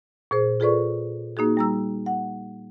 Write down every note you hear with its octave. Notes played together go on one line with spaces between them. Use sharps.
A#2 G#4 C5
F4 G#4 A4 B4 D5 C#6
A#3 D#4 F#4 G#4
G3 A#5 E6
F#5